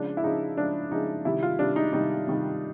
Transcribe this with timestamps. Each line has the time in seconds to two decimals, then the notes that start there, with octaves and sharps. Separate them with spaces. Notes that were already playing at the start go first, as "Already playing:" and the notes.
Already playing: C#3 F3 G#3 D4
0.17 E4
0.23 C#3 F3 G#3 D#4
0.57 C#3 F3 G#3 D4
0.92 C#3 F3 G#3 D#4
1.25 C3 D#3 G3 E4
1.43 F4
1.59 C3 D#3 G3 D4
1.76 D#4
1.93 C3 D#3 G3 D#4
2.27 C3 D#3 G3